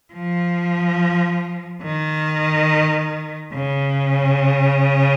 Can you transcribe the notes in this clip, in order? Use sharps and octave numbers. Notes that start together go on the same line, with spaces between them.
F3
D#3
C#3